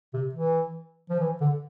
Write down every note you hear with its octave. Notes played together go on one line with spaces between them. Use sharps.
C3
E3
F3
E3
D3